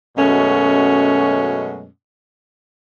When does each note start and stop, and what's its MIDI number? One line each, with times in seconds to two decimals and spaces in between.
0.16 1.87 42
0.16 1.87 47
0.16 1.87 56
0.16 1.87 57
0.16 1.87 61